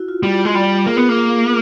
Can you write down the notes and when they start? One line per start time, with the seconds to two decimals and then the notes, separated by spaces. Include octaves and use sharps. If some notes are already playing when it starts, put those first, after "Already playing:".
Already playing: E4 F#4
0.08 F4
0.23 G3 F4
0.45 G#3
0.55 G3
0.85 A#3 G#4 A#4
0.97 B3
1.09 A#3